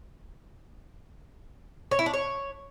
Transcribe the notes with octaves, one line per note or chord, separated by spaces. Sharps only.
C#5
E4
D4
C#5